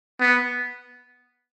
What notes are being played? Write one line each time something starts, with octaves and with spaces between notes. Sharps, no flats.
B3